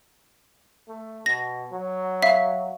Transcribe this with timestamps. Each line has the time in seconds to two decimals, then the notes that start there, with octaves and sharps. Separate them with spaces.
0.88 A3
1.26 B2 A#6
1.72 F#3
2.22 E5 F5 B6